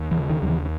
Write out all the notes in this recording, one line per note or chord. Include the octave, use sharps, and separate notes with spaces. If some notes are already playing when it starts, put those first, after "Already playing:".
Already playing: D#2
E3
C#3
D#3
D#2 F#3
E3